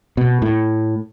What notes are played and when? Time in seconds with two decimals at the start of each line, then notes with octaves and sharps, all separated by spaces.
0.17 B2
0.42 A2